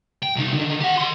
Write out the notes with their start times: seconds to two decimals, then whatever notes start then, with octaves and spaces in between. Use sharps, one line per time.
0.23 G5
0.36 C2 D#4
0.54 D3 D#3
0.80 G4 F#5
0.98 D#3 C6